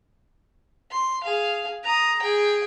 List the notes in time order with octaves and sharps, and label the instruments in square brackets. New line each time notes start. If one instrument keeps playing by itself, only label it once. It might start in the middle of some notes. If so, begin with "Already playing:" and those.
[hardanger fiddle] C6
G#4 F5
A#5 D#6
G#4 G5